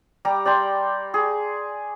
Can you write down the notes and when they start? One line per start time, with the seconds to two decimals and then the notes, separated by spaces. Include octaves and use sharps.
0.25 G3 G4 A#5
0.45 D5 G5 A#5 C6
1.14 G#4